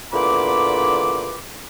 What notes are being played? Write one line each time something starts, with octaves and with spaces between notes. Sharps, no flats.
E2 A#2 D3 B5 D6